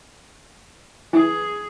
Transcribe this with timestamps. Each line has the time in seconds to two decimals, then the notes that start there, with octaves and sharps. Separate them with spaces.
1.13 E3 G#4